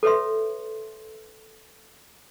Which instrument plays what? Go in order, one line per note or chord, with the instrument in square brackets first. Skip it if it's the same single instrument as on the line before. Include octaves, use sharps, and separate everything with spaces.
[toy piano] A4 B4 C#5 E5 C6